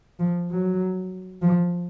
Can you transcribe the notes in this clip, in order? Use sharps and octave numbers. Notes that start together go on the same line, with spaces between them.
F3
F#3
F3